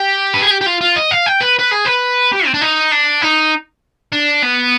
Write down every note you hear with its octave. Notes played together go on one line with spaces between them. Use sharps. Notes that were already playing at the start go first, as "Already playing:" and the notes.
Already playing: G4
B4
G#4
G4
G4
F4
F4
D#5
F5
G5
B4
B4
G#4
B4
G4
C4
D4
D#4
D4
D#4
D4
B3